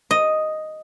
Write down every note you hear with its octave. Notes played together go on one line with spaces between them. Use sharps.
D#5